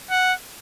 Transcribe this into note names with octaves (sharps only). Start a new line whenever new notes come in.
F#5